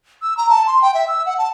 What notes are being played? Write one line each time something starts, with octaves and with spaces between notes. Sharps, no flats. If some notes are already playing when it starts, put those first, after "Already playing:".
E6
A#5
A5
C6
G5
E5
E6
F#5
A5